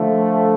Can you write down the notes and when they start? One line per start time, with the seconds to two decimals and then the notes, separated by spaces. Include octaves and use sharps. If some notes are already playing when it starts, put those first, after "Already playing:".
Already playing: D3 F3 A3